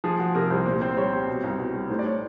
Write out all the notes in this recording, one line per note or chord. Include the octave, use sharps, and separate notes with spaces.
F3 G#4
F3 F#4
C3 A#4
C2 C5
A#2 C5
C4 C5
G3 C#5
C4
B2
C2
B2
G3
A2 C5
D5
A2 C#5